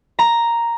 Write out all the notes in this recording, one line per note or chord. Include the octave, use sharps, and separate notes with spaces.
A#5